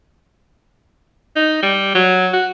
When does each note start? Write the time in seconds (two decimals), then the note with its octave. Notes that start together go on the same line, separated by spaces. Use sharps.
1.36 D#4
1.62 G3
1.95 F#3
2.33 F#4